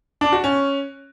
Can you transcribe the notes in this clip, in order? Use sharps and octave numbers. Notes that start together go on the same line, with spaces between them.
D4
F#4
C#4